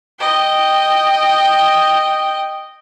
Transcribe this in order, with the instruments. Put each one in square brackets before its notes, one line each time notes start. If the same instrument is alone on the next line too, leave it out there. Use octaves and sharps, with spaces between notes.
[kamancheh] D#5 G5